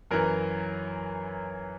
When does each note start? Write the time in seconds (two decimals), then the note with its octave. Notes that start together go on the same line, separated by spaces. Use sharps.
0.11 F#2 E3 A#4